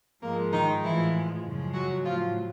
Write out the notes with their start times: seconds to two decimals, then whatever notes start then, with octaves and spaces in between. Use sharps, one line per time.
0.22 G#2 F3 G#3 A#3
0.53 D#3 D#4
0.84 A2 E3 F3 G#3 E4
1.44 F#2 C#3 F3 G#3
1.74 F#3 F#4
2.04 A2 F3 F#3 F4